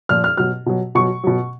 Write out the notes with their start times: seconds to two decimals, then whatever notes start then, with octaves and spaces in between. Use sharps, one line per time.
0.09 A#2 F3 F6
0.24 F6
0.37 B2 F#3 F6
0.66 B2 F#3
0.95 B2 F#3 C#6
1.24 B2 F#3